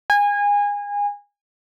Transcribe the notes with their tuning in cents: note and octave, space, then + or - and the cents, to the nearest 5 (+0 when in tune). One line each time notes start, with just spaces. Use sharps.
G#5 -25